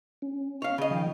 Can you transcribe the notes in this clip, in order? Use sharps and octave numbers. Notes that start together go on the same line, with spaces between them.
C#4
C#5 F5
C#3 D#5
D#3 F3 G5